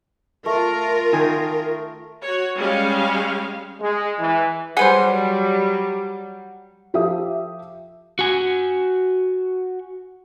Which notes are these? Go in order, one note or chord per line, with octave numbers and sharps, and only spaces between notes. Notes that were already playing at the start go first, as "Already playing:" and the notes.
A3 F4 A#4
D#3 G#5
F#4 C#5
G3 G#3 C#4 F5
G#3
E3
F#3 G3 G#4 B4 C5 F#5
F3 G4 A4 E5 D#6
F#4 G#5